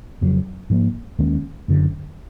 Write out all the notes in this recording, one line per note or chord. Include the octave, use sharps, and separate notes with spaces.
F1 F2 C#3 F#3
G#2 F3 A#3
D#2 D#3 G#3 C#4
F#1 F#2 D3